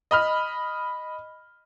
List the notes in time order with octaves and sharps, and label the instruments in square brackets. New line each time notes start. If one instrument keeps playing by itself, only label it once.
[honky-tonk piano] D#5 B5 F6